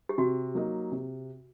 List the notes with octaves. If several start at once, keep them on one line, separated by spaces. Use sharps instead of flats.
G4
C3 F#4
F#3 A#3 D#4
C3